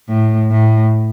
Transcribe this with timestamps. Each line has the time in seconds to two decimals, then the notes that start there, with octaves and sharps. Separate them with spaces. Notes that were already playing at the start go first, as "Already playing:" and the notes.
0.08 A2
0.51 A2